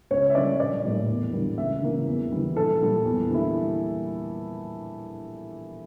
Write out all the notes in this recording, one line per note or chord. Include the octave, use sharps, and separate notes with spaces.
C#2 C#5
E5
C#3 G3 A#3 D5
A#1 D5
A2 G3 A#3
E2
D3 G3 A#3
C#2 E5
C#3 E3 A#3
E2
E3 G3
A#1 A4
A#2 G3 A#3
E2
D3 G3 A#3 E4